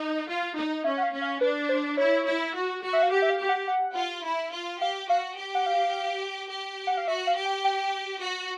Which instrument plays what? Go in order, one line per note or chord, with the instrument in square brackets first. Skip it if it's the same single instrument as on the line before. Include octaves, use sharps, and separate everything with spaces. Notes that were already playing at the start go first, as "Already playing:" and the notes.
Already playing: [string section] D#4
F4
D#4
[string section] C#4 [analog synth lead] E5
[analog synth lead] F#5
F5
[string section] C#4
[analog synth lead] F5
[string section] D4 [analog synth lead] B4
[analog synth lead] C5
[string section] E4 [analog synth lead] C#5
[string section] E4
F#4
F#4
[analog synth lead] E5
F5
[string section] G4 [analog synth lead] F#5
[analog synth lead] E5
F5
[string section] G4
[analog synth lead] F#5
F#5
[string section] F4
E4
F4
[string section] G4 [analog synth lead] F5
[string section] F#4 [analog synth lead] F5
[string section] G4
[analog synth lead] F#5
F5
[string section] G4
[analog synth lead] F#5
F5
[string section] F#4 [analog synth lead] E5
[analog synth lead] F5
[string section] G4
[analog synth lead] G5
G5
[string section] F#4